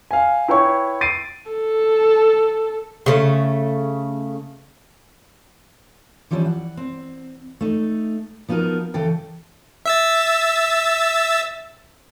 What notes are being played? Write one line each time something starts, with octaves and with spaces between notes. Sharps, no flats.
F5 G#5
E4 B4 C#5 G5 C#6
A6 C7 D7 D#7
A4
C#3 A3
E3 F3 G3 C#4 E4
F#5
C4
A3 D#4
F3 B3 D#4 F#4 A#4
C#3 E3 G#4 A4 G5
E5 E6 A6